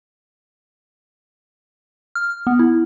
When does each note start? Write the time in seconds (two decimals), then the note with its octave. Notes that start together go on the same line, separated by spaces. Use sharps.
2.15 F6
2.47 B3
2.59 E4